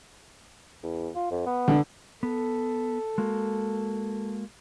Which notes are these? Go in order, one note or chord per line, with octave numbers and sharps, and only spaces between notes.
E2
F4
F2
B3
D3
B3 A4
G#3 A#3 F#4